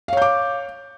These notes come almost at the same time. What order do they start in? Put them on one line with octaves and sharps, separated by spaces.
F5 C#5 G6 D6